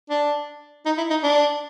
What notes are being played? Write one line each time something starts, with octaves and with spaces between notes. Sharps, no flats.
D4
D#4
E4
D#4
D4